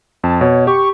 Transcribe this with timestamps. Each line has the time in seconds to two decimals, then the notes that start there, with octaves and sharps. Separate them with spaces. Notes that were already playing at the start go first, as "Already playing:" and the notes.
0.24 F2 A5
0.41 B2 C#5
0.67 G4 C#6